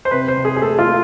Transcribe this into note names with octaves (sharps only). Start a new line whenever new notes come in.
C5
C3 B4
C5
C3
G#4
G#4
A3 A4
F4
A3